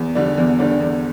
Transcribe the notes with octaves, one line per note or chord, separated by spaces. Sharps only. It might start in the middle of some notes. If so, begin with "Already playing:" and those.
Already playing: E2
D3 G3 D4
E2
D3 G3 D4
E2